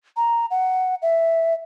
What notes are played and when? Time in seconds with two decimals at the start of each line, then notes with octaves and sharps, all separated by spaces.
0.17 A#5
0.51 F#5
1.02 E5